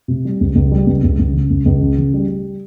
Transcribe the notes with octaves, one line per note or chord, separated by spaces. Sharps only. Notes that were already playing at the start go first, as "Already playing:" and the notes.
C3
G3
C#2
C#2
G3
C#2
C#2
C#2
C#3
C#2
C#2
C#3
C#3
G3
G3